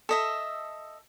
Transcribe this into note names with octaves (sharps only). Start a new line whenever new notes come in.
A4 D#5 E5